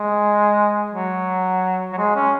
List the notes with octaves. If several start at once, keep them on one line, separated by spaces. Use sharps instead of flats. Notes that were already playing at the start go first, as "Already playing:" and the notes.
Already playing: G#3
F#3
F#3
G#3
C#4